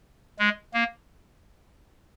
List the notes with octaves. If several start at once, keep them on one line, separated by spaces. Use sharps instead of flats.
G#3
A#3